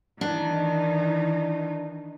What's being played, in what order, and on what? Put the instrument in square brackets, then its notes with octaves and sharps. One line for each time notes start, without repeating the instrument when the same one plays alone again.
[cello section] D#3 E3 D#4 [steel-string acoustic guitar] D4